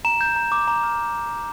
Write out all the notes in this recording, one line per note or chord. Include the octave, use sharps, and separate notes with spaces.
A#5 E7
G6
A#5
D6
A#5
F6